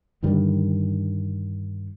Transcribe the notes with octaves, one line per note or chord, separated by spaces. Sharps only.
G2 D3 D#3 G3